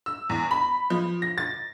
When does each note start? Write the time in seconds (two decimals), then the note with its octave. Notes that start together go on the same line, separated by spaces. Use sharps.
0.06 E6
0.30 E2
0.51 B5
0.90 F3
1.22 A#6
1.38 A6